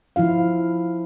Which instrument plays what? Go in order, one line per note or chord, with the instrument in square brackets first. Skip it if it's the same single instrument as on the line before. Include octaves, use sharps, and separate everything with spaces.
[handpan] F3 E4 F4 F5